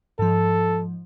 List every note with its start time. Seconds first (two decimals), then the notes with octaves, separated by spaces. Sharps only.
0.19 G#2 F3 A4